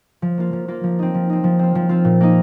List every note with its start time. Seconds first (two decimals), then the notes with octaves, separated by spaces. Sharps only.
0.22 F3
0.38 A#3 F4
0.53 F3
0.68 A#3 F4
0.83 F3
0.99 C4 D#4
1.14 F3
1.30 C4 D#4
1.44 F3
1.59 C4 F4
1.75 F3
1.89 C4 F4
2.05 A#2
2.20 A#3 D#4